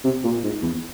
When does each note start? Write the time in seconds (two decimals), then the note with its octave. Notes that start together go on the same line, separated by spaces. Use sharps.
0.04 C3
0.24 A#2
0.44 G#2
0.62 E2